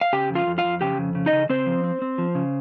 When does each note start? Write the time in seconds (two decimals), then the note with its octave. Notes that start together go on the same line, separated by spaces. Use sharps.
0.01 F5
0.13 C#3 G4 G5
0.30 F2
0.35 F4 F5
0.47 F2
0.58 F4 F5
0.64 F2
0.81 C#3 G4 G5
0.98 F2
1.15 C#3
1.26 D#4 D#5
1.33 C#3
1.49 C#3 C4 C5
1.66 F3
1.84 C4
2.02 C4
2.18 F3
2.35 C#3